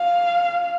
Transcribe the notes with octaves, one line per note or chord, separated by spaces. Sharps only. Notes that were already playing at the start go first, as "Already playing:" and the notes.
Already playing: F5